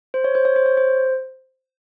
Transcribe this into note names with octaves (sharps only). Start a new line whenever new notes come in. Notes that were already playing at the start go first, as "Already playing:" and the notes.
C5
C#5
C5
C#5
C5
C#5
C5